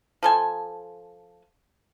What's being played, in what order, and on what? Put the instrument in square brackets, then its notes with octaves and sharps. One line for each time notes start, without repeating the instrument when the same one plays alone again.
[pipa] F3 A4 G#5